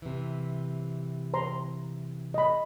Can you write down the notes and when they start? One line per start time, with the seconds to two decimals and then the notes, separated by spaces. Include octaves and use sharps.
0.02 C3 E3
1.34 C5 A#5 C6
2.34 D#5 B5